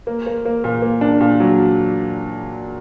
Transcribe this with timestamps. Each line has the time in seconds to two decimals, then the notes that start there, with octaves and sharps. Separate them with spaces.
0.07 A#3
0.26 A#3
0.45 A#3
0.64 A#2
0.82 A#3
1.01 D4
1.21 A#2
1.40 F#3